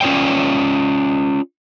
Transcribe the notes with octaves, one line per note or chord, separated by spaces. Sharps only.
C#4 F4 C#5 D5 G5